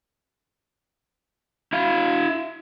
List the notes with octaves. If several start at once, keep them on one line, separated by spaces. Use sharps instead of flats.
E4 F5